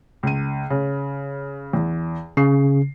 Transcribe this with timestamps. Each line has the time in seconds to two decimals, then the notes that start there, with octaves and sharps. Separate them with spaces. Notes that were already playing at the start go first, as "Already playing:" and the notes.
0.23 C#2 D#7
0.70 C#3
1.73 E2
2.37 C#3 C7